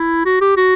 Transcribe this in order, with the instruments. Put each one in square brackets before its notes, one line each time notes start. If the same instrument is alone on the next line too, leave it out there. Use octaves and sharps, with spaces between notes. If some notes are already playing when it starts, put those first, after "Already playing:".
Already playing: [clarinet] E4
F#4
G4
F#4